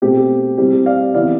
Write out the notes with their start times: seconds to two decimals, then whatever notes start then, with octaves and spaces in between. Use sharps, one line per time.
0.02 B2 A3 C4 G4
0.58 C3 G3 C4 E4 G4
0.86 D5 F5
1.14 C3 E3 B3 E4 D5 F5